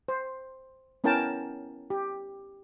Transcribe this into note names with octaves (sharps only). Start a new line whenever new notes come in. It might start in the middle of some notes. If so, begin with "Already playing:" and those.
C5
B3 C#4 E4 A#4 G5 A5
G4